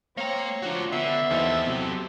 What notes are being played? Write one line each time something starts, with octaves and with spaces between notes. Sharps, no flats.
A#3 C4 C#5 A#5
F3 D4 F#4
D3 B3 E5 C7
D#2 E3 C4 A4 D#5
C3 F#3